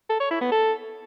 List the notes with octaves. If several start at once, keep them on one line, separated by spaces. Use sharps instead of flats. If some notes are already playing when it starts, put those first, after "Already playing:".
A4
C#5
E4
B3
A4